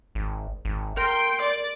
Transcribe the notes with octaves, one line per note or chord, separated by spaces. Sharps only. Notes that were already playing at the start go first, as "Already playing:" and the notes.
G#1
G#1
A#4 G5 C6
D5